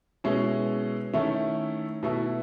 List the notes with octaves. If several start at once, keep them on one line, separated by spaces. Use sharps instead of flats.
B2 G#3 C#4 E4
D#3 A3 C#4 E4
B2 A3 E4